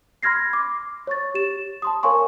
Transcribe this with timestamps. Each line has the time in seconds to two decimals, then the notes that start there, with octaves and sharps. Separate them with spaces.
0.23 B5 C6 F6 G#6 A#6 C7
0.53 D6
1.07 C#5 C#6 A6
1.34 G4 E7
1.82 A5 C6 D#6
2.03 A#4 C#5 F5 G#5 C6 C#6